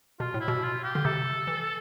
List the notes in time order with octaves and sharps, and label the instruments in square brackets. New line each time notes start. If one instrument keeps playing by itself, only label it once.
[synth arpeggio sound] B2 [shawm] F4
[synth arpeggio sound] A2
[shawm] E4
[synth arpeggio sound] B2
[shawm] F4
G4
[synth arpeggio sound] D3
[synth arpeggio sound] C3 [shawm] A4
[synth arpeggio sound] E3